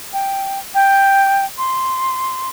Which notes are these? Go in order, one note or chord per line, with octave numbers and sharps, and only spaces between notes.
G5
G5
C6